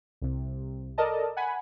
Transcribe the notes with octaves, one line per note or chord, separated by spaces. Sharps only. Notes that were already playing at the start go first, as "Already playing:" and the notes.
C2 C3
A4 A#4 D5 D#5 A5
F#5 G#5 B5